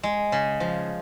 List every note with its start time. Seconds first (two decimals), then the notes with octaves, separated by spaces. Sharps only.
0.03 G#3
0.32 C#3
0.60 F3